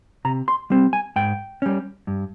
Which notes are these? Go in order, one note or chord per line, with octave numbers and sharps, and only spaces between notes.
C3 A#5
C6
G3 C4
G#5
G#2 G5
G3 C#4
G2